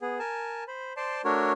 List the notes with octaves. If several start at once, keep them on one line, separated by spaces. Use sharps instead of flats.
B3 G#4
A#4 G#5 A5
C5 B5
C5 D5 A5 C6
A3 D4 F#4 A#4 C#5